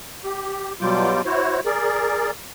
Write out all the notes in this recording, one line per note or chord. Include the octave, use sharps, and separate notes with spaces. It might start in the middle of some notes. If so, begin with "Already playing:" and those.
G4
B2 F#3 G3 F4 D6 G6
E4 F#4 C5 C#5
G#4 A#4 D5